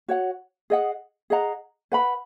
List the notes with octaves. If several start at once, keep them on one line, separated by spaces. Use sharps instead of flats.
F#4 C#5 F#5
G#4 D#5 F#5
G#4 D#5 F#5 A#5
B4 F#5 B5